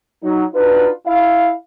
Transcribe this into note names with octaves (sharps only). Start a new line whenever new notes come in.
F#3 D#4
D4 D#4 F4 F#4 B4
E4 F5